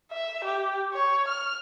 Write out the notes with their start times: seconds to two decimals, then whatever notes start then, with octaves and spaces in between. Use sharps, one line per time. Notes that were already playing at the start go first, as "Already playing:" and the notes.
0.12 E5
0.44 G4
0.93 C#5
1.28 F6